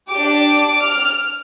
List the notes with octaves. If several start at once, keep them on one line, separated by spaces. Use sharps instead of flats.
D4 G4 D6
F6